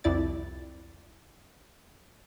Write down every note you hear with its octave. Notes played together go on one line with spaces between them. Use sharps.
C2 F2 E4 D5 A6